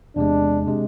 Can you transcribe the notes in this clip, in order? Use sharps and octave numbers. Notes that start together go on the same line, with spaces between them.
E2 C3 G#3 D4
C3 G#3